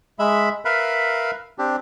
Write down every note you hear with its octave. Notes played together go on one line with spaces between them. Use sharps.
G#3 E5 B5
A#4 B4 E5 F5 B5
C4 D4 G4